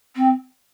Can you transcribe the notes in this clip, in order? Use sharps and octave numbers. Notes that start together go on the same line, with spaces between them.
C4